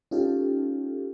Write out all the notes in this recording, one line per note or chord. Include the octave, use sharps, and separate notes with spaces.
C#4 D#4 F4 G4 A4